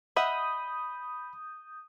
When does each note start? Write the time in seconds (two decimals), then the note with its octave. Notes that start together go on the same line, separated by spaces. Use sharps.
0.16 D#5 E5 F#5 B5 D#6 G6